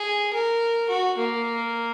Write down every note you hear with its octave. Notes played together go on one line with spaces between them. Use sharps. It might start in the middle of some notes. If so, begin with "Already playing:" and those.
Already playing: G#4
A#4
F#4
A#3